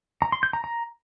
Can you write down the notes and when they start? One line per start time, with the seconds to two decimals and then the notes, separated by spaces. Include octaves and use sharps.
0.22 A#5
0.32 C6
0.43 G6
0.53 A#5
0.64 A#5